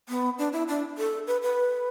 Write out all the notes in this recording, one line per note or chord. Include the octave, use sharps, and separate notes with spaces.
B3
D4
E4
D4
A4
B4
B4